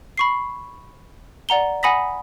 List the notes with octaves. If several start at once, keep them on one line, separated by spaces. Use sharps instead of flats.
B5 C#6 C7
D5 F#5 A#5 G7
F#5 G#5 B5 D#6 A#6 B6